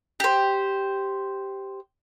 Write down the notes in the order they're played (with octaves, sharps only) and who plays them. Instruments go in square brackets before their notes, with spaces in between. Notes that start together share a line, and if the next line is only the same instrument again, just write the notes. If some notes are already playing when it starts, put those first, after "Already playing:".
[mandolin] G4 C5